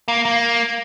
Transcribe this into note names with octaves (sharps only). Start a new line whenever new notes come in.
A#3
A#3